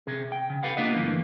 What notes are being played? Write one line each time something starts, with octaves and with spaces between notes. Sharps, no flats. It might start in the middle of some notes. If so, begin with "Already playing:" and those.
C3 G#4
G5
C#3
G4 A4 B4 F5 F#5
A#3 B3 D4 F4 B4 D#5
G2 D3 E3 F#3 A3 A#3